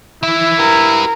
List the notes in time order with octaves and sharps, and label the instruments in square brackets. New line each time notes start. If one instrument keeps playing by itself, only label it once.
[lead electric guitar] E3 E5 [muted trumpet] E4
[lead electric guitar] G4 B4 [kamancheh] A#4